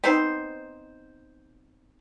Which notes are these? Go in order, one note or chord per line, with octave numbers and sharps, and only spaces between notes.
B3 C4 D#4 C5